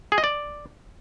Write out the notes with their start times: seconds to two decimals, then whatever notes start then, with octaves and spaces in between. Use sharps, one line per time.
0.12 G#4
0.18 D#5
0.24 D5